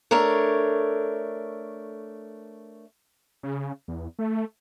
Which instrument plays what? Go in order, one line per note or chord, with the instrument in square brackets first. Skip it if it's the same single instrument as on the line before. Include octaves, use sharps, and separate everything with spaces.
[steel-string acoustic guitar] A3 D4 A#4 C#5
[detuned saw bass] C#3
E2
A3